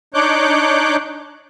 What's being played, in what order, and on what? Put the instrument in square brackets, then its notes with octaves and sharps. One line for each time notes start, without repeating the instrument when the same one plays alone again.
[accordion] D4 D#4 C#5 D6 F#6 G6